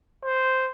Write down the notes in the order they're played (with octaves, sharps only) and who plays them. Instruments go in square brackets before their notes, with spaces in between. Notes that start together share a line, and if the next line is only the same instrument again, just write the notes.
[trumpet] C5